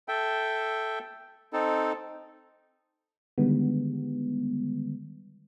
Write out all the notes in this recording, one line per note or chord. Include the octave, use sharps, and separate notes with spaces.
A4 E5 G5
C4 D#4 A4
D3 D#3 G3 G#3 B3